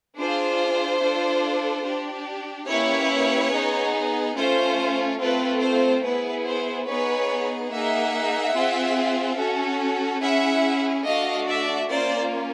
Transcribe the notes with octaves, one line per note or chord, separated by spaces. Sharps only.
D4 F4 G#4 C5
D4 F4 A4
D4 G4
A#3 C#4 E4 G4 B4 C#5
B3 D#4 G#4
A3 C#4 F4 C5
A3 C4 F4 A4 B4
C5
B3 E4 G#4 B4
C5
B3 D#4 G#4 B4 C#5
A#3 D#4 G#4 E5 F#5
C4 F4 G#4
C#4 F#4 A4
C#4 E4 G#4 E5 F#5
A3 D4 F#4 D#5 F5
D5 E5
A#3 C#4 F4 C5 D5